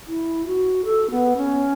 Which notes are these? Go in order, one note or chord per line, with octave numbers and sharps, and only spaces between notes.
E4
F#4
A4
B3
C#4